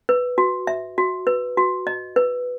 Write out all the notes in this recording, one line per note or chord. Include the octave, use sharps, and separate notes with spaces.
B4
F#4
E5
F#4
B4
F#4
D#5
B4